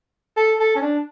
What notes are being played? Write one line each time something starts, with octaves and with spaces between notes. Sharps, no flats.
A4
A4
C#4
D4